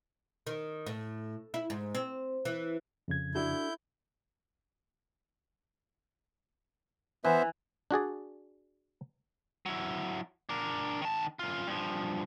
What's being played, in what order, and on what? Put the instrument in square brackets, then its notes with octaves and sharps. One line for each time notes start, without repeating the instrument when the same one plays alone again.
[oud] D#3
A2
E4
G#2
C4
E3
[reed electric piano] F2 C#3 G#6
[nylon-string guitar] D4 F#4 A4 [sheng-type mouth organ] E4 G6
[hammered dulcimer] E3 [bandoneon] B3 C5 E5
[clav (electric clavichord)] D4 F#4 G#4 D5
[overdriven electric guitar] F#3 E4
D4 A#4
D#3 A5
F#2 F4
G2 F3